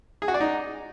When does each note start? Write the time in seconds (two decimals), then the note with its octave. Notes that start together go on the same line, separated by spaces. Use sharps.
0.22 G#4
0.28 F#4
0.34 D5
0.40 D#4